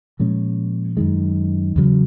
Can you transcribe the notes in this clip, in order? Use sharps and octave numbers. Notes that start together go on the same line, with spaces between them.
A#2 F3 G#3 C#4
F#2 D#3 G#3
E2 C#3 F#3